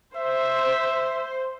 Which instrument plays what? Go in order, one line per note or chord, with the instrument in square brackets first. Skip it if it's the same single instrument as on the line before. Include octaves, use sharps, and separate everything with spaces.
[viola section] C5 [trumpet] E5